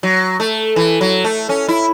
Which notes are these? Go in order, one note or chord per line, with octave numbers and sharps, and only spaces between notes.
F#3
A3
E3
F#3
A3
C#4
E4